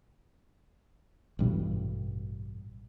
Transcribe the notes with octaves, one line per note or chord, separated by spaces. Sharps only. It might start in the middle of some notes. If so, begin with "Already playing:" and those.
A1 G2 B2 E3